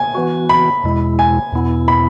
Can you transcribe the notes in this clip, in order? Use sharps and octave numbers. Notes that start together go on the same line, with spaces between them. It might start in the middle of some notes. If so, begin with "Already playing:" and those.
Already playing: G#5
E3 B3 F#4
B5
E2 B2 G#3 E4
G#5
E2 B2 B3 E4
B5